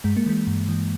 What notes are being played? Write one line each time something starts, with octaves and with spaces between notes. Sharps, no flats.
G2 G#3
A#3
E3 G#3
G2
E3